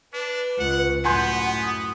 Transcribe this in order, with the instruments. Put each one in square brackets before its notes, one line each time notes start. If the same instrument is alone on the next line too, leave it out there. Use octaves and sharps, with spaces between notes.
[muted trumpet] D4 [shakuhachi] B4
[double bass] C#2 [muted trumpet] F#5
[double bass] F#2 A2 [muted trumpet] B3 [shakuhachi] F#5 [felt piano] G#5 C6 G6
[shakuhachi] D#6